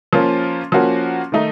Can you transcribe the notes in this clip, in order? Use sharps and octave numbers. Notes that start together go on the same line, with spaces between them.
F3 A#3 C#4 F4
F3 A#3 C#4 F#4
D#3 A3 D#4